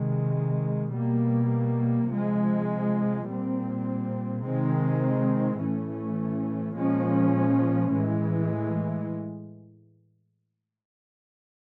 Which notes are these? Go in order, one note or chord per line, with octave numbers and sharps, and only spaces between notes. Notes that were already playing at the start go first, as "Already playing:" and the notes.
Already playing: C3 D#3 G#3
B2 G3 A#3
C3 F3 G#3
A#2 G3 C4
C3 D#3 G#3 C4
A2 E3 A3 C#4
A#2 F3 G#3 C#4
A2 E3 G#3